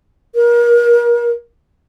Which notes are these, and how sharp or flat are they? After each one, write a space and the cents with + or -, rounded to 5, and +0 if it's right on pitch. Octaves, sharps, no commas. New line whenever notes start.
A#4 +30